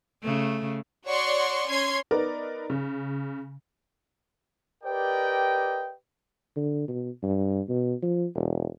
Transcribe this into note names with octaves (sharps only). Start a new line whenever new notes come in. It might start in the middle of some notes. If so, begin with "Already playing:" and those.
C#3 A3
F#4 C#5 D5 C6 C#6
C#4 C#5 C6 G#6 C7
B3 D#4 A#4 B4 D5
C#3
G4 A#4 B4 D5 D#5 G5
D3
B2
G2
B2
F3
E1